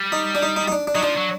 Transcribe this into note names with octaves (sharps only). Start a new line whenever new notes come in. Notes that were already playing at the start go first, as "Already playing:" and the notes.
Already playing: G3
D#4
D4
D#4
D#4
D#4
D4
D4
F#3 D#4
F3 D4
F#3